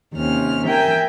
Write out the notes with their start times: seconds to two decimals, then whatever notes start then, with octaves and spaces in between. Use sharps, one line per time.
0.13 D#2 C3 C#4 F6
0.66 A#4 E5 G5 G#5